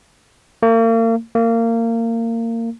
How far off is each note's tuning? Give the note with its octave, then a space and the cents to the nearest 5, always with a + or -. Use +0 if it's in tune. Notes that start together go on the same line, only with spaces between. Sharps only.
A#3 -40
A#3 -25